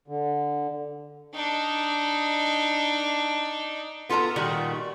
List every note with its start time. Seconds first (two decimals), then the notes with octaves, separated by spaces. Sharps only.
0.08 D3
1.34 D4 D#4
4.09 B3 F4 A4 A5 A#5
4.36 A#2 D#3 G3 F#4